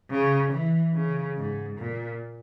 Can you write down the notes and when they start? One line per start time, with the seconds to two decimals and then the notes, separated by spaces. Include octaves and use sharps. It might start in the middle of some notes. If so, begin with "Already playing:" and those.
0.10 C#3
0.52 E3
0.94 C#3
1.37 G#2
1.78 A#2